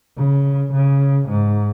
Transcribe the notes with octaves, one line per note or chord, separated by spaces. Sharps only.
C#3
C#3
G#2